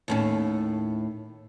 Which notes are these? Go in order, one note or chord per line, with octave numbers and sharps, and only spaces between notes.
D#2 A2 C#4